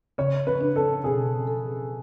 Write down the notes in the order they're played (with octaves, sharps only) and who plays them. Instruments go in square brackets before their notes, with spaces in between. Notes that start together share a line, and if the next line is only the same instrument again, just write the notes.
[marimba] C#3 [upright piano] C#5
[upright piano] B4
[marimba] D4
[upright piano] A4
[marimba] B2 [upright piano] G#4
[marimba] A4